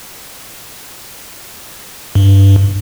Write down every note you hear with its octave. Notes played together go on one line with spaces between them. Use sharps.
G2